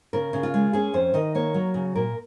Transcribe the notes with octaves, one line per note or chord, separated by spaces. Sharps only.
C#3 A#4
C#3
F4
G#3
C#4 G#4
F2 C5
D#3 D#5
A#3 C#5
F#3
C#3
A#2 A#4